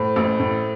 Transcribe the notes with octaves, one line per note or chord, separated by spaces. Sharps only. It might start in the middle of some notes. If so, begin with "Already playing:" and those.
Already playing: A2 C5
A1
A2